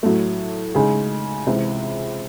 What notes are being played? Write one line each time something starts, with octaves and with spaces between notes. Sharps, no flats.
A2 F#3 A3
C#3 G#3 D#4 G#4
C#2 C3 E3